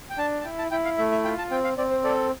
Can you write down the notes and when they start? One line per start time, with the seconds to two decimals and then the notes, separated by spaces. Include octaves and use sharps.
0.10 G5
0.18 D4 A5
0.41 A5
0.45 E4 G5
0.58 A5
0.71 E4 G5
0.85 F5
0.98 A3 E5
1.12 E5
1.24 F4 G5
1.38 A5
1.51 C4 G5
1.64 F5
1.78 C4 D5
1.91 C5
2.04 A4 D5